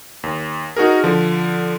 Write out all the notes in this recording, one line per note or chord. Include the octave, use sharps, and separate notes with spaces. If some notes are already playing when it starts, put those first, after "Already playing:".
D#2
D#4 F#4 G#4 A#4
D3 F3